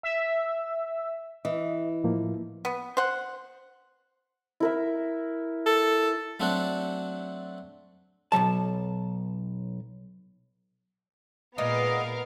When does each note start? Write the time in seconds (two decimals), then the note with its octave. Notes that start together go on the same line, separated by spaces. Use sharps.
0.03 E5
1.45 E3 D#5
2.04 A2 F3 A#3
2.65 B3
2.97 C5 F#5
4.60 E4 A#4 E5
5.66 A4
6.40 F#3 A3 C4 D4 F#4
8.32 B1 F2 F#3 A5
11.58 A#2 G#3 B3 D#4 A#4 D5 D#5 F5